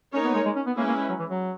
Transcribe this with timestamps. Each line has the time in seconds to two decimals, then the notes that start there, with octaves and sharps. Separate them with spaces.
0.13 A#3 C#4 D#4 A#4 C#5
0.24 B3
0.34 G#3
0.45 G#3
0.56 C#4
0.66 B3
0.77 G#3 A#3 C#4 E4 B4
0.88 A#3
1.09 F#3
1.19 E3
1.30 F#3